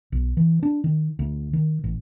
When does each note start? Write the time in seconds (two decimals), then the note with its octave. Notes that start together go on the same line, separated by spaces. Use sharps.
0.12 B1
0.37 E3
0.63 D4
0.84 D#3
1.19 D2
1.53 D#3
1.84 A1